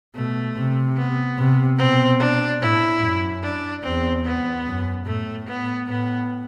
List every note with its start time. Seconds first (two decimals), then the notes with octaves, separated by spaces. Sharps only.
0.15 B2 A3
0.56 C3
0.97 B3
1.38 C3
1.79 B2 C4
2.20 D4
2.61 A2 E4
3.02 F#2
3.43 D4
3.83 E2 C4
4.25 B3
4.66 F#2
5.06 A2 A3
5.47 B3
5.88 A2 B3